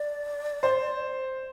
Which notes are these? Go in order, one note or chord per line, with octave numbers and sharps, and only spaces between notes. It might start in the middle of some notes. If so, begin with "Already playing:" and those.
Already playing: D5
C5